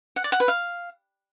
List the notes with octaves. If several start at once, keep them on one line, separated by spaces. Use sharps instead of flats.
F#5
D5
F#5
B4
F5